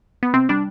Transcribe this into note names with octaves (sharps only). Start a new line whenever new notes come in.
B3
C3 C4
G3 D4